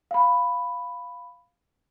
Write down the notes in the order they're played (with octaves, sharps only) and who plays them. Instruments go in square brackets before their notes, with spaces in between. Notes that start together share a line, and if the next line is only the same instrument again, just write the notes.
[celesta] F5 B5